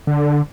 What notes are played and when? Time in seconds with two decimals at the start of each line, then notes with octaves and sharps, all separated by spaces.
0.07 D3